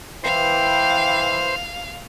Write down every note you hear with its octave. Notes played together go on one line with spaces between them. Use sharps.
E3 C5 F5 G5